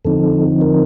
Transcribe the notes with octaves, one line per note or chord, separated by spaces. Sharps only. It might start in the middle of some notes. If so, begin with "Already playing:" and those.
F2 D3 F3 C4 D#4 A4
A#4